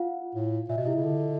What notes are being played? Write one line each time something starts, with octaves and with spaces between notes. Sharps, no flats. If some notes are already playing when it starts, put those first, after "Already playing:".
Already playing: F4 F5 F#5
A2
A#2 E5
B2 D#5
C3 E4 E5
C#3
D3